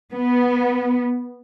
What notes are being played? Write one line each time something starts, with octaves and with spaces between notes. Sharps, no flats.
B3